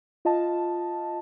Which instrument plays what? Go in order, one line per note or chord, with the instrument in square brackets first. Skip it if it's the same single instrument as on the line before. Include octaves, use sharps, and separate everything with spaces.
[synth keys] F4 D#5 A5